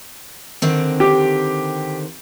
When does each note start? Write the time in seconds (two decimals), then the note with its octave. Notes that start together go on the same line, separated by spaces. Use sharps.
0.62 D3 D#3 C4
1.00 G4